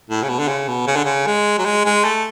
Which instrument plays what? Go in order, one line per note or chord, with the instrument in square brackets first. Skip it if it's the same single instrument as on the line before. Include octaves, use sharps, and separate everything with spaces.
[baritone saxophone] A2
C#3
B2
D3
C#3
B2
C#3
D3
C#3
G#3
F#3
G#3
G#3
A3